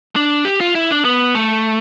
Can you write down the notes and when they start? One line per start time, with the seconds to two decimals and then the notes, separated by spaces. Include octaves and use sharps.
0.16 D4
0.45 G4
0.61 F4
0.75 E4
0.91 D4
1.05 B3
1.35 A3